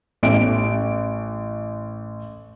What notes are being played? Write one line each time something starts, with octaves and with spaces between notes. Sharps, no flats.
A1 D7